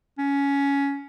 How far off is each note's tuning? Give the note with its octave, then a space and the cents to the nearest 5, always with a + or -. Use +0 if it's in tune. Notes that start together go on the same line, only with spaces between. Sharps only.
C#4 +15